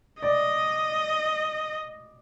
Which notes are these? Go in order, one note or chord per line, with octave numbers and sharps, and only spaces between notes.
D5 D#5